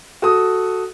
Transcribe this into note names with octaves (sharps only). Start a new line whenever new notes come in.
F#4 A4 D#6